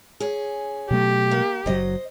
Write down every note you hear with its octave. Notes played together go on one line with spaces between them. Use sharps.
C#4 G#4
B2 F#3 A3 G4
A#3
F#1 A2 F#3 C5 D#5